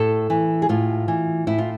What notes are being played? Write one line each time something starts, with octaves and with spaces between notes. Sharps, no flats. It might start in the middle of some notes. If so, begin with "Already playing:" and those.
Already playing: A2 A4
E3
G#4
A2 F4
E3
A2 E4
F4